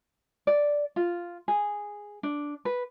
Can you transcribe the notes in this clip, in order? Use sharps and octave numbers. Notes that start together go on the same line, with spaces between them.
D5
F4
G#4
D4
B4